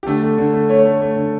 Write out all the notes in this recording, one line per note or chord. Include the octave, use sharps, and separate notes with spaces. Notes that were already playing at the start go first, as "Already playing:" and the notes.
G4
D3 A3 A4
A3
D3
A3
A3 C#4 C#5
A3
A3
D3